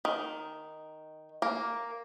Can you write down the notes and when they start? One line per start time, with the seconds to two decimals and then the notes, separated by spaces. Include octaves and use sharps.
0.05 D#3
1.42 A#3